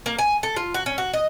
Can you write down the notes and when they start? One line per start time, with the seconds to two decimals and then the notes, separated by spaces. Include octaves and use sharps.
0.06 A#3
0.19 G#5
0.43 A4
0.56 F4
0.74 F#4
0.86 C#4
0.98 F#4
1.13 D#5